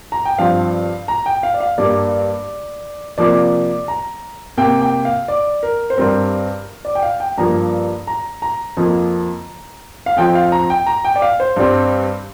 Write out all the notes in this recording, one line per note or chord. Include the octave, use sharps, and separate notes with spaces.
A#5
G5
G2 F3 C4 F5
A#5
G5
F5
D5
F5
G2 G3 A#3 D5
C3 F3 A#3 D5
A#5
C3 A#3 G5
G5
F5
D5
A#4
C5
G2 G3 C4 A#4
D5
G5
F5
G5
G2 F3 A#3 A#5
A#5
A#5
F2 F3 A#3
F5
F2 F3 C4 G5
F5
A#5
G5
A#5
G5
D5
F5
C5
G2 G3 C4